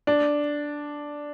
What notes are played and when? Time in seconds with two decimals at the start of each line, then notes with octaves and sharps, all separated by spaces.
0.07 D4